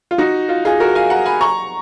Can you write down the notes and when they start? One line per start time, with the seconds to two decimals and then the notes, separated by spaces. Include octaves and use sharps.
0.11 F4
0.18 D#4 F#4
0.49 F4
0.65 F4 G#4
0.80 F#4 A#4
0.95 F5 G#5
1.10 F#5 A#5
1.26 G#5 B5
1.41 A#5 C#6